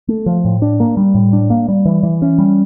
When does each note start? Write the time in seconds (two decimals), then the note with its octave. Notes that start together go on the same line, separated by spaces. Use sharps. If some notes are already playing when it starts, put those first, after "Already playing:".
0.08 A3
0.26 F3
0.45 A2
0.62 D4
0.80 A#3
0.97 G3
1.15 A2
1.33 D4
1.50 A#3
1.69 G3
1.85 E3
2.03 E3
2.22 C#4
2.38 G3